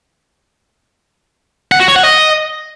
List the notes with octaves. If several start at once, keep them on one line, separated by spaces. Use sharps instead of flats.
F#5
F#4
C#5
F#5
D#5